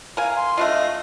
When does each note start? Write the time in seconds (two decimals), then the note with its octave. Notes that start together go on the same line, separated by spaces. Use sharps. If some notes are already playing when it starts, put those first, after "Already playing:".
0.17 A#4 F5 G#5
0.37 C6
0.57 A3 D4 F4 D#5